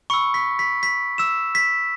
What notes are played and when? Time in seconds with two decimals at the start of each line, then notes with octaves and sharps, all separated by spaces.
0.10 B5 C#6 E6 C#7
0.34 B6
0.59 B6
0.83 B6
1.18 E6 E7
1.55 B6